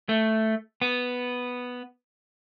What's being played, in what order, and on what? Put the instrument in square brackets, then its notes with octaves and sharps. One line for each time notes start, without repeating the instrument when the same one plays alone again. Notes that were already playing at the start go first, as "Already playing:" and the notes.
[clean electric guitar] A3
B3